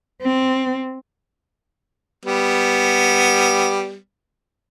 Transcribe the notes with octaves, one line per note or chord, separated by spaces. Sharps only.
C4
G3 B3